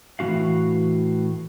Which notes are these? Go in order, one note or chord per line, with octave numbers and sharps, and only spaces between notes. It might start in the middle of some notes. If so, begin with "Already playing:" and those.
A2 E3 C#4 F#4 F5